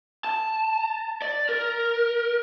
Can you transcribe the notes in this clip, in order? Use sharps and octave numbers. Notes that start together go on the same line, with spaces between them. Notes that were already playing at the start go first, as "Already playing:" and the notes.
A5
D5
A#4